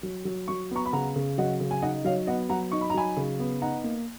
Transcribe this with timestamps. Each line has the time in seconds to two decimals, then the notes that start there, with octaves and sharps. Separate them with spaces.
0.03 F#3
0.25 F#3
0.48 F#3 C#6
0.71 B3 A#5 C#6
0.86 B5
0.93 C#3 F#5 A#5
1.16 C#3
1.38 F#3 D#5 F#5
1.60 C#3
1.71 G#5
1.82 D#4 D#5 F#5
2.05 F#3 C#5 F5
2.27 B3 D#5 F#5
2.50 F#3 F#5 A#5
2.71 D#4 C#6
2.81 B5
2.90 A#5
2.94 F#3 G#5 B5
3.17 C#3
3.39 B3
3.62 D#4 F#5 A#5
3.84 A#3